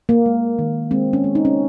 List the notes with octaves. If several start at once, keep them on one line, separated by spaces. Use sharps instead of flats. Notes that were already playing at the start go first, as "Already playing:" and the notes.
A#3
G#3
D#3
G#3 C4
C#4
G#3
D#4
C#4